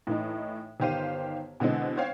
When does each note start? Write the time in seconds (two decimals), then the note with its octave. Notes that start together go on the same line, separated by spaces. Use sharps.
0.07 A2 E3 D#4
0.80 G1 D#3 G4 C5 F5 D#7
1.60 B2 D3 E3 G#3 C4
1.97 C5 C#5 F5 G5